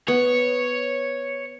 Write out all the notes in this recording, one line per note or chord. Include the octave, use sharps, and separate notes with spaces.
B3 C#5